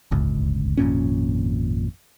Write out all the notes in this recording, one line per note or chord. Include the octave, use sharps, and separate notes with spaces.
D1 G1 C#2
G#1 F2 A#2 C#4